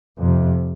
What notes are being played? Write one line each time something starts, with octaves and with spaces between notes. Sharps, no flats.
F2 C3